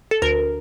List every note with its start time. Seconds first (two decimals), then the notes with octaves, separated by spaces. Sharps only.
0.11 A4
0.22 D2 A#4